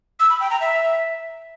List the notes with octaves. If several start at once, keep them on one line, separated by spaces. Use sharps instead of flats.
E6
B5
G5
A#5
E5